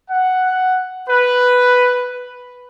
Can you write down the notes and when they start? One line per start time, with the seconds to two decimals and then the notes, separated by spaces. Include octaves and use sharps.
0.10 F#5
1.09 B4